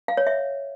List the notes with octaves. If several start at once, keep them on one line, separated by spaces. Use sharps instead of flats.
F5
C#5
E5